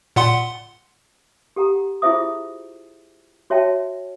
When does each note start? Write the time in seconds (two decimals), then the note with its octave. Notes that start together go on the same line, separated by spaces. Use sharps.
0.16 A#2 F#5 C6
1.56 G4 A4 F#5 A#5
2.02 E4 F4 G#4 C5 E5 D#6
3.50 F#4 C#5 E5 G5 A5